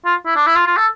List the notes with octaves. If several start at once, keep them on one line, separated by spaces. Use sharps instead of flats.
F4
E4
D4
E4
F4
F4
A4